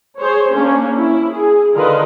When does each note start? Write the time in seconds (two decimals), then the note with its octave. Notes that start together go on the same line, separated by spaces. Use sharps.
0.18 G#4 C5 C#5
0.53 A#3 C#4 D4
0.96 E4
1.32 G#4
1.74 D3 D#3 F4 A#4 B4 D#5